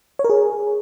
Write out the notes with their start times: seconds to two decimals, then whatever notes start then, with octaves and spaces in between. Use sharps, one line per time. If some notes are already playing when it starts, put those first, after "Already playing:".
0.19 C#5
0.24 A#4
0.30 G#4